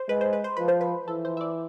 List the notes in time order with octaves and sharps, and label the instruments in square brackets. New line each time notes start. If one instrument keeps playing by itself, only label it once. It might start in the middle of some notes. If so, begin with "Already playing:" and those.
Already playing: [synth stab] C5
[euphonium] G#3 [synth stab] B4
[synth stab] C5
B4
C5
[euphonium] F3 [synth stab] B4
[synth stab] C5
B4
[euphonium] E3 [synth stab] A4
[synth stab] C5
E5
D5